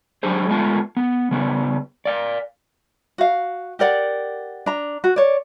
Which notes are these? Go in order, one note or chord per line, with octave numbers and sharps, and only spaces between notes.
F#3 D4 G4 G#4 C5
G#3 A3 B3 F4 G#5 A5
B3
C#3 G3 B3
D5 F5
F#4 F5
G4 A#4 D5 F#5
D4 A#5
F#4
C#5 D5